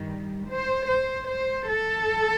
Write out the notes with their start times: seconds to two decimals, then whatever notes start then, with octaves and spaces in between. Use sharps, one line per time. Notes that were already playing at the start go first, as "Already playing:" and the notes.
Already playing: G2 D#3 G3
0.47 C5
0.87 C5
1.28 C5
1.69 A4